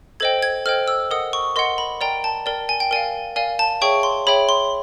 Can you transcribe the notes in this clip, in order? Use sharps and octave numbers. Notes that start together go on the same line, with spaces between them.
A4 C5 D#5 G5 G#6
G#6
A4 C5 D#5 G5 F6
E6
A#4 D#5 F#5 D#6
C#6
A#4 D#5 F#5 C6
B5
A#4 D5 G5 A#5
A5
A#4 D5 G5
G#5
G5
A#4 D5 F5 G#5
A#4 D5 F5 G#5
A5
G#4 C#5 E5 G5 C#6
C6
G#4 C#5 E5 G5 B5
C6